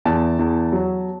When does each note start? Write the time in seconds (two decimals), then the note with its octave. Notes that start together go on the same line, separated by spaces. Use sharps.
0.05 E2 A5
0.39 E2
0.72 F#3